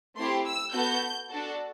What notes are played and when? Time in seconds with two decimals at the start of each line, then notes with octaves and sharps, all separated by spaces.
0.17 A3 C4 E4 G4 C6
0.45 E6
0.73 B3 F#4 A4 G6
1.30 D4 F#4 A4